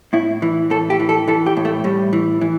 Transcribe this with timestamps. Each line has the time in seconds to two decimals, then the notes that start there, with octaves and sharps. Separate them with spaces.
0.13 A2 E4
0.42 E3
0.70 A2 A4
0.90 G4
1.00 E3
1.09 A4
1.28 E3 A4
1.46 G4
1.57 A2
1.65 A3
1.84 A2 G3
2.13 E3
2.41 E3